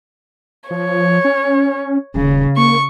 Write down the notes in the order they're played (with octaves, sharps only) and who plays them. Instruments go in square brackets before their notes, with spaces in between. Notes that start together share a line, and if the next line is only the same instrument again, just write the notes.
[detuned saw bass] F3 [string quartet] C#5
[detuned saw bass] C#4
[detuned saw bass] D#1 [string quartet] C#3
[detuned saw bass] A#3 [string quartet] C#6